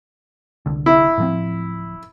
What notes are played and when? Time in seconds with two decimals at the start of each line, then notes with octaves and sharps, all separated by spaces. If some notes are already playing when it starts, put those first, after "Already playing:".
0.66 D1 C2 D3
0.86 E4
1.18 A2 F3 C4